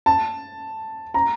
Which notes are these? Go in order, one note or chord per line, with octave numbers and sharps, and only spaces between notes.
A5
A#5